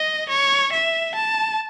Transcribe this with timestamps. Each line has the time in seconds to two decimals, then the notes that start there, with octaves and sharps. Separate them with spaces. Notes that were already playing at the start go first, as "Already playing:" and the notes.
Already playing: D#5
0.29 C#5
0.72 E5
1.15 A5